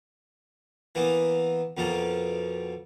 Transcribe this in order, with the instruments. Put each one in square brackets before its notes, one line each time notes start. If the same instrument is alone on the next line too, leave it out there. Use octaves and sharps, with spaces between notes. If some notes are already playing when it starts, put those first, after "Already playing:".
[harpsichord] E3 A#3 B3
F2 B2 A#3 F4